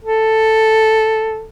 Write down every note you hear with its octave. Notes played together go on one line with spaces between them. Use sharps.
A4